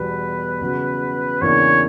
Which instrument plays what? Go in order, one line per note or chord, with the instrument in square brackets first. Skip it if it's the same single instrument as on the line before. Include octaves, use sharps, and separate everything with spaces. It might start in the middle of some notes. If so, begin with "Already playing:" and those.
Already playing: [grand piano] E2 B2 G3 [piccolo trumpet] B4
[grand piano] E2 C#3 F#3
[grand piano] E2 C#3 E3 A#3 D4 [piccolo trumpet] C#5